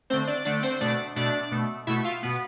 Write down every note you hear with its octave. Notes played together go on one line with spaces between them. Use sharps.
D3 A3 C4 C5
D4 D5
D3 A3 D4 D5
C4 C5
B2 A3 D4 D5
B2 A3 D4 D5
B2 A3
B2 A3 E4 E5
F4 F5
B2 B3